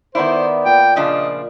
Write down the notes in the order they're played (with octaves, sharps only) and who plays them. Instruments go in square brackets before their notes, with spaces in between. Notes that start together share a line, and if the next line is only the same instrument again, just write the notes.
[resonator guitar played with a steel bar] D#3 E4 [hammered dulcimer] B3 A#4 D5 [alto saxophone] C5
[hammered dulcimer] A#2 [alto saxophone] G5
[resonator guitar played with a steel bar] C#3 F3 D4 [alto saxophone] D#5 [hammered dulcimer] E5